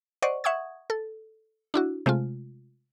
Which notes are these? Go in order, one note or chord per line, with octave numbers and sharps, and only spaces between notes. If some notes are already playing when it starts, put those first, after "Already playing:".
C5 D5 D#5 F#5 C#6
E5 F#5 C#6 D#6 G#6
A4
D4 E4 F#4
C3 G#3 A3 F4